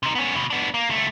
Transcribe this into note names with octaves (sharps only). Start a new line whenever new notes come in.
C3 D#4
B3 C#4
D2 B2
B3 D4
A#3
C#2 A3